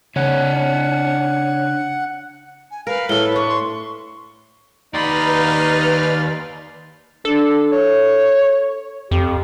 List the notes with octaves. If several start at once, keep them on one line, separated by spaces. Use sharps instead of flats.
C#3 D4 C#5 F#5
G#5
A#4 B4 F5
A2 A4 G7
D4 C#6
C6
D#2 D#4 B4 D5 B5 C6 F6
D4 A4
C#5
F2 G4